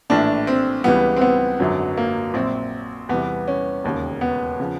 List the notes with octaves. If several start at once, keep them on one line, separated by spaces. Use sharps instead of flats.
A#1 A2 E3 D4
C4
C#2 C#3 E3 G3 B3
C4
B3
G#1 F#2 D3 F#3
A#3
A#1 A#2 F#3 C4
E2 C3 E3 G3 B3
C#4
E1 D#2 C#3
B3
C#3 F3